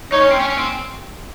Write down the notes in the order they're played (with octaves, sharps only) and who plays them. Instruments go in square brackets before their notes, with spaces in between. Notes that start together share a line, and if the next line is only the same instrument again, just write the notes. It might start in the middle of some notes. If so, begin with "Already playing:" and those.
[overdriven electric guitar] D#4 [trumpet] C#5
[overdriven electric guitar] C#4
C4
C#4
C#4
C4